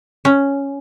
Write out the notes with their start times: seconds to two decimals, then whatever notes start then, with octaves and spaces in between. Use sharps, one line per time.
0.25 C#4